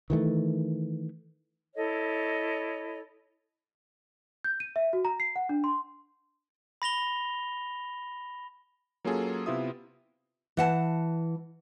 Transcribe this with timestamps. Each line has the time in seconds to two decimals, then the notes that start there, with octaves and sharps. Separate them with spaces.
0.10 D#3 E3 G#3 A3
1.76 E4 A4 C#5 D#5
4.44 G6
4.60 D#7
4.76 E5
4.93 F#4
5.05 A#5
5.20 C7
5.36 F#5
5.49 D4
5.64 C6
6.82 B5 A#6 F7 G7
9.05 F#3 A#3 C#4 F4 G#4 A4
9.46 C3 B3 E4 F4 E5 D#6
10.57 E3 F#5 A5